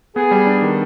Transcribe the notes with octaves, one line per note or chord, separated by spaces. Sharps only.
B3 G#4
G3
D4
D#3